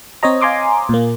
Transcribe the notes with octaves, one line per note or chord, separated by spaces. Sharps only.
C4 C5 C#5 D#5 A#5
F5 G#5 A#5 C6 D6 D#6
A#2 A#3